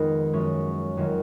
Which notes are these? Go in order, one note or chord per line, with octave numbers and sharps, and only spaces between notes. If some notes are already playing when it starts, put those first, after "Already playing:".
Already playing: F2 D#3 G#3 B3 D#4
F#2 F3 G#3 C#4
F2 D#3 F#3 C#4